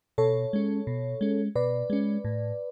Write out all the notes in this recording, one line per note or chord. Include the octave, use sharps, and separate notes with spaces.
B2 A4 C#5
G#3 C#4
B2
G#3 C#4
B2 B4 D5
G#3 C#4
A2